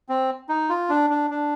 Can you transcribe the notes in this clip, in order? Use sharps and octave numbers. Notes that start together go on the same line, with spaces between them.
C4
D#4
F4
D4
D4
D4